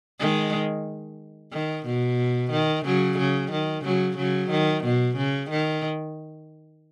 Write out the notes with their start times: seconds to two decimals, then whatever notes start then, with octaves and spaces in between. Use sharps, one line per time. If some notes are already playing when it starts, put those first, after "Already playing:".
0.20 D#3 G#3
1.53 D#3
1.86 B2
2.51 D#3
2.85 C#3 F#3
3.18 C#3
3.51 D#3
3.84 C#3 F#3
4.17 C#3 F#3
4.50 D#3
4.84 B2
5.17 C#3
5.50 D#3